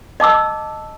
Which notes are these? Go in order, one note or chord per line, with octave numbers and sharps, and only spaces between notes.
D#5 A5 D6 E6